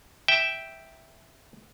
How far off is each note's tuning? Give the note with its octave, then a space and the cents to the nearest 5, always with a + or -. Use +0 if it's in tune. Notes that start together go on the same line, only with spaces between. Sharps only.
E5 -5 G5 +0